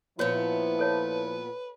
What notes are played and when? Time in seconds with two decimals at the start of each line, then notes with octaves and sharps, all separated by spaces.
0.19 A#2 F3 B3 E4 F#4 B4 C#5
0.79 A4 C#5 A5